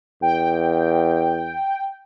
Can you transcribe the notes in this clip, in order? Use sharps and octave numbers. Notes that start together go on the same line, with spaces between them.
E2 G5